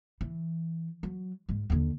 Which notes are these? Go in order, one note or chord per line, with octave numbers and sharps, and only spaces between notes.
E3
F#3
G#2 G#3
D#2 D3